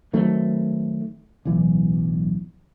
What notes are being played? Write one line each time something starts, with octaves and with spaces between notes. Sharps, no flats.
D#3 F#3 A3 C4
D1 B1 E3